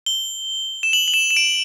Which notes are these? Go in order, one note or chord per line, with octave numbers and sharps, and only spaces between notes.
G7
E7
F#7
F#7
E7
E7
D7